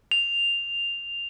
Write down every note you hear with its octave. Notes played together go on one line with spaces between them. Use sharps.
F7